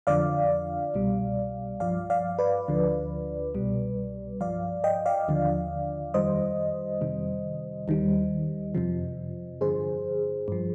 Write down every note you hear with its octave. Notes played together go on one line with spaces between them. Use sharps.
F2 D3 F3 D5 F5
C2 B2 G3
G2 F3 D5 F5
D5 F5
B4 D5
D2 D3 F3
C2 B2 G3
G2 F3 D5 F5
D#5 G5
D5 F5
D#2 D3 F3
F2 D#3 G3 C5 D#5
F2 C3 D#3 G3
D#2 D#3 G3
F2 C3 F3
G2 D3 F3 G#4 C5
G2 F3